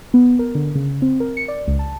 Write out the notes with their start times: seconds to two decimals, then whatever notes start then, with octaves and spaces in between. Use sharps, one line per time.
0.14 B3
0.39 A#4
0.55 D3
0.75 C#3
1.02 C4
1.20 A#4
1.37 C#7
1.48 D5
1.67 C#2
1.79 A5